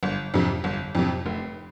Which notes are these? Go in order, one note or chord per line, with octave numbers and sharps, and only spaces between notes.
G1
F2 C3
G1
F2 C3
F1